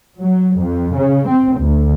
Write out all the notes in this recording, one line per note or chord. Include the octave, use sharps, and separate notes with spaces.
F#3
F2
C#3
C4
D2